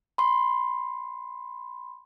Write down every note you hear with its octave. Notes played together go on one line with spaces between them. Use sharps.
B5 C6